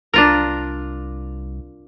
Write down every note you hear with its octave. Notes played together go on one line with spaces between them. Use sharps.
C2 D4 F4 A#4